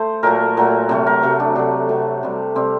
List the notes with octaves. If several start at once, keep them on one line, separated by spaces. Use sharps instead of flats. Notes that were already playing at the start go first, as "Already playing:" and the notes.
Already playing: A3 C5
A#2 F#3 A3 A#4
A#2 F#3 A3
C3 F#3 A3
A#4
C3 F#3 A3
D4
C3 F#3 A3 D4
C3 F#3 A3
C3 G3
C3 G3 C4